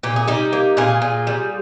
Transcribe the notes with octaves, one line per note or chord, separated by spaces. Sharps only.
A#2 G4
G#4
G3 D#4 G4
A#3
A#2 F4 G#4
A#2
G3